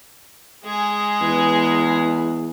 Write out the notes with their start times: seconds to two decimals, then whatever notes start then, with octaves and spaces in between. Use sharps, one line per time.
0.65 G#3 G#4
1.21 E2 B4